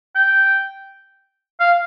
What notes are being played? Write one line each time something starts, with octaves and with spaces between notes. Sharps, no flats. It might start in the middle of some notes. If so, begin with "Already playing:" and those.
G5
F5